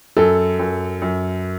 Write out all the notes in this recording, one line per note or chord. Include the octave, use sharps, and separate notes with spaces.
F#2 A4
F#2
F#2